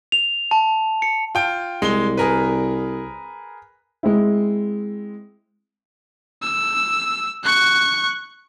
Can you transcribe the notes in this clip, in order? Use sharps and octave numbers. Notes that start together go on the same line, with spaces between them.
F7
A5
C#7
F4 G5
C2 G#3 G7
G#4 A#4 B4
G#3 C4 E4
E6
C#6 F#6